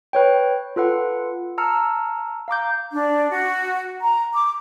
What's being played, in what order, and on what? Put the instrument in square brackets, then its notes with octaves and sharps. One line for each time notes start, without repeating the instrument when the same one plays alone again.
[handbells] B4 C#5 G5
F4 A4 B4 F#5
A5 A#5 E6 F6 C#7
F5 A#5 D6 G6
[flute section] D4
F#4
A#5
D6